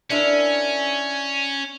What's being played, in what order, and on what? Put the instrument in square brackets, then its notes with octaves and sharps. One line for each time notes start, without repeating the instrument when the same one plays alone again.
[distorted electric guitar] C#4 [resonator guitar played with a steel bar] D4 E4 A#4